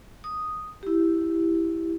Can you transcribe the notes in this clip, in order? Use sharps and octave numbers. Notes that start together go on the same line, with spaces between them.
D#6
E4 G4